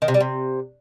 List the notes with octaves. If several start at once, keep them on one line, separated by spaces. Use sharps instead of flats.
D#3
C3
G3
C3